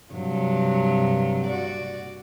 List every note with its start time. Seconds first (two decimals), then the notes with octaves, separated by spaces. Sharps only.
0.14 G2 C3 F#3
1.47 F#4 D5